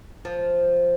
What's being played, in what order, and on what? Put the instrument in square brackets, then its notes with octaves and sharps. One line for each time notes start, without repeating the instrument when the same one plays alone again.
[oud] F3